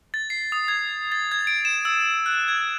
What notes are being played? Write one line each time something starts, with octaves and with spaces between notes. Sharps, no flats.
A6
C7
D#6
G#6
A6
G#6
D7
E7
E6
F#6
G#6